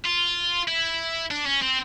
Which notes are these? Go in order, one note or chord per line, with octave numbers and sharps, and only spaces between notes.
F4
E4
D4
C#4
C4